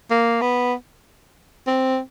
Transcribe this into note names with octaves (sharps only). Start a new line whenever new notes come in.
A#3
B3
C4